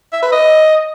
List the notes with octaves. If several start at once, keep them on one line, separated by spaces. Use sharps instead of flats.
E5
B4
D#5